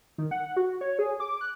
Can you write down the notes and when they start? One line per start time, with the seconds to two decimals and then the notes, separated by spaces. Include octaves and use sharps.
0.18 D#3
0.31 F#5
0.56 F#4
0.81 C#5
0.99 G#4
1.20 D6
1.41 F#6